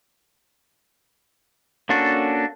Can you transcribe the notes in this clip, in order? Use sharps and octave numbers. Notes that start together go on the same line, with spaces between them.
A#3 C#4 D4 F#4 A4